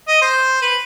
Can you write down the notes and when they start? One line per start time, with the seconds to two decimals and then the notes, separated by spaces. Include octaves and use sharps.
0.08 D#5
0.22 C5
0.62 B4